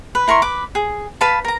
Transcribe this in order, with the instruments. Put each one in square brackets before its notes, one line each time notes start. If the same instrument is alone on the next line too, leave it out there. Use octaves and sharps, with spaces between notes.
[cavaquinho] B4
E4 A#4 C6 C#6
B4 D6
G#4
B4 F5 A5 B5
A#4 A#5